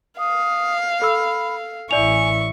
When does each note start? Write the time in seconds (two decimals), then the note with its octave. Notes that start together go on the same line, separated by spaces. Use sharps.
0.19 F5 D#6
1.02 A4 B5 E6
1.91 A1 E4 D5 G#5 C#6 F7